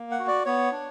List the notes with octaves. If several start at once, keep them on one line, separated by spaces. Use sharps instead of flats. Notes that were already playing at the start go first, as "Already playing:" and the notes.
Already playing: A#3
F#5
F#4
D5
B3 C#5
D4